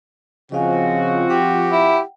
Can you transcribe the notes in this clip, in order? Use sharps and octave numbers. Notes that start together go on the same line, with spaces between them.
C#3 F3 C4 F#4 D#5 F5 G#5
G4 F#5 G5
E4